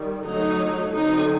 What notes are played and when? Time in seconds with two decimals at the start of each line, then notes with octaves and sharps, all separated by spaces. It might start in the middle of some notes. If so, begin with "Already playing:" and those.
Already playing: D#3 G3
0.25 D3 F#3 A3 D#4
0.94 D3 F#3 C4 D#4